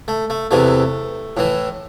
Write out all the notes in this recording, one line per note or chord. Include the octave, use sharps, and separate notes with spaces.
A3
A3
E2 C3 E3 A3
A2 E3